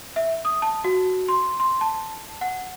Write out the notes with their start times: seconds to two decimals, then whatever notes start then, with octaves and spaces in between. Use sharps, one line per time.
0.16 E5
0.45 D#6
0.62 A5
0.84 F#4
1.28 C6
1.60 C6
1.81 A5
2.41 F#5